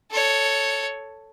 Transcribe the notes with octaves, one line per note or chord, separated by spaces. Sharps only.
A4 C#5